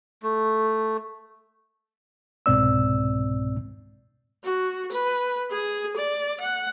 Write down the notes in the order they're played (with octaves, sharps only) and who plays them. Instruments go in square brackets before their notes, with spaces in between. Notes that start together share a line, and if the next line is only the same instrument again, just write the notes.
[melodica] A3
[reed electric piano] C2 G#2 B2 C4 D5 E6
[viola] F#4
B4
G#4
D5
F#5